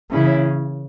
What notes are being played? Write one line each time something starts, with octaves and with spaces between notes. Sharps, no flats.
C#3 E3 A#3 C#4 E4